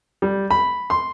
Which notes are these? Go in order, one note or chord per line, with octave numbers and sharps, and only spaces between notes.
G3
B5
C6